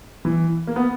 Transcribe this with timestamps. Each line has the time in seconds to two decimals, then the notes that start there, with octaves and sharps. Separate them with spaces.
0.25 E3
0.67 A#3
0.76 B3